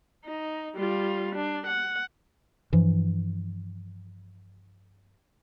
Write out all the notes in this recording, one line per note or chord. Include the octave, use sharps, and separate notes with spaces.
D#4
G3 F4
D4
F#5
G2 E3 F3